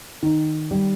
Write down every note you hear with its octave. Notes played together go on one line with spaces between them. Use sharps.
D#3
G3